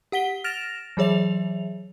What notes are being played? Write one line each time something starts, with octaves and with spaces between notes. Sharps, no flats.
G4 F#5 B6 G7
F6 A6 A#6 D7 E7 F7
E3 F#3 G#4 C#5 E5 F7